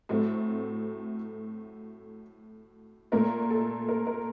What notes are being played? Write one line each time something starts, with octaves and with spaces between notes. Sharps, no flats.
A2 F#3 A3 C4
A#2 A3 A#4
A4
A#4
A#4